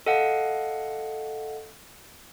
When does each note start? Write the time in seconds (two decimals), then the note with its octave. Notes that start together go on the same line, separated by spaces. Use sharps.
0.06 A4 D#5 F5 F#5